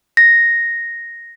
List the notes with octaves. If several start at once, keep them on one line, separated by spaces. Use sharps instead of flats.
A#6